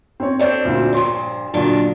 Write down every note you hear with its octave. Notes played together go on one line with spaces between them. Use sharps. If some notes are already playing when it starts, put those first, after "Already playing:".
C4 C#5
C4 D4 A4 C#5 D5
D2 A#2
G2 A#2 F3 C#5 C6
A#2 D3 D#3 F#3 D4 F4